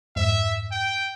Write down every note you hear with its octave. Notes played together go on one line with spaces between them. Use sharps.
F2 G#2 E5
G5